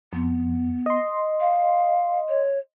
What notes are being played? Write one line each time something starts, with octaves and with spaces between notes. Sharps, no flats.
F2 B3
D#5 C6
F5
C#5